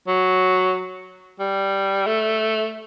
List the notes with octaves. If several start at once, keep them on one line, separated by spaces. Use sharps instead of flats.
F#3
G3
A3